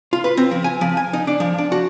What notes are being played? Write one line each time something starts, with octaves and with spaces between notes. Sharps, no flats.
F4
B4
C4
F3
G#5
F3
G#5
D#4
D4
F3
D4
F#4